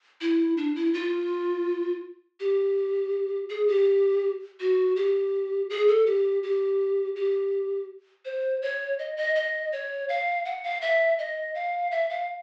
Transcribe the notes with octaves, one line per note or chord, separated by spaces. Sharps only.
E4
D4
E4
F4
G4
G#4
G4
F#4
G4
G#4
A4
G4
G4
G4
C5
C#5
D#5
D#5
D#5
C#5
F5
F#5
F5
E5
D#5
F5
E5
F5